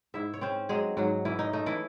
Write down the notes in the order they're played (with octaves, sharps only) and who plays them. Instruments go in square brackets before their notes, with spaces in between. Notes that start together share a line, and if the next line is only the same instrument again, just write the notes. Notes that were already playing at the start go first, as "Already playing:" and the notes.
[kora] G#2 E4 E5
C#5
C4 C#4 C5
F#3 G#3 G#4
G#2 F#3 F#4
E3 C#4 E4
D#4
A3 D#4
E3 E4